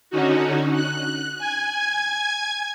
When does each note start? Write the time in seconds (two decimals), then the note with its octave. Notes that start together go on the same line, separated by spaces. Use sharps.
0.10 D3 C#4 D#4 F#4
0.73 F#6
1.38 G#5 G#6